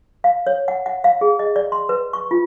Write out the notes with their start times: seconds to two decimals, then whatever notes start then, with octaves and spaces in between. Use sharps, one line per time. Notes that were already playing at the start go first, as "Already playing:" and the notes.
0.24 F5
0.47 C#5
0.68 F#5
0.86 F#5
1.04 F5
1.21 G#4
1.39 D#5
1.56 D5
1.72 C6
1.89 B4
2.13 C#6
2.31 F4